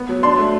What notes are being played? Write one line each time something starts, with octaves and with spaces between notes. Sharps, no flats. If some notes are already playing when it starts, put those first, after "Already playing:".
Already playing: B3
F#3
D4 C6
A3